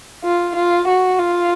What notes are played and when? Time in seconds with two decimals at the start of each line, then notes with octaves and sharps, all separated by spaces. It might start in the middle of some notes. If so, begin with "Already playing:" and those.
0.24 F4
0.56 F4
0.87 F#4
1.19 F4